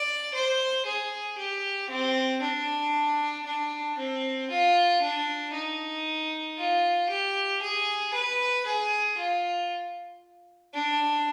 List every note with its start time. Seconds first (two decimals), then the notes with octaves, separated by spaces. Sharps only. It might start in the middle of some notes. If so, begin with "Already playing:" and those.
Already playing: D5
0.34 C5
0.86 G#4
1.38 G4
1.90 C4
2.42 D4
3.46 D4
3.98 C4
4.50 F4
5.02 D4
5.54 D#4
6.58 F4
7.10 G4
7.62 G#4
8.14 B4
8.66 G#4
9.18 F4
10.74 D4